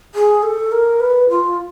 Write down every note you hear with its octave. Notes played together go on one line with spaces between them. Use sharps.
G#4
A4
A#4
B4
F4